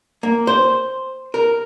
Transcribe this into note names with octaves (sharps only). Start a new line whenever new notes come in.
A#3
C5
A#4